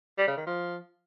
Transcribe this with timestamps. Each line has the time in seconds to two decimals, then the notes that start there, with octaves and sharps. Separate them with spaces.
0.18 G3
0.27 C#3
0.37 D#3
0.47 F3